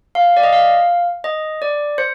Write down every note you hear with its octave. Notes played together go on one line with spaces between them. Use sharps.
F5
D5
D#5
F5
D#5
D5
C5